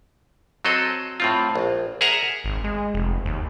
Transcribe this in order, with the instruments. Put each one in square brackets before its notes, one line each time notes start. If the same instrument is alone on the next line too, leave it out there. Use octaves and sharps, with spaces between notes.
[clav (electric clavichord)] F#3 C4 A4 D#5
A2 C4 F4
A#1
G#4 A#4 E5 F#5 A#5
[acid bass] G#1
G#3
F1
D#2